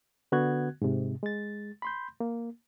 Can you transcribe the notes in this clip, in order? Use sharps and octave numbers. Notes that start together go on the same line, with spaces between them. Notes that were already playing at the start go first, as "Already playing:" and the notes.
D3 B3 F#4 F#6 G#6
G#2 C3
G#3 A6
B5 C6 G6
A#3